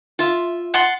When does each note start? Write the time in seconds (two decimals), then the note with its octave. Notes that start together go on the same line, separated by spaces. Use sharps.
0.19 F4 E5
0.74 F#5 A5 C6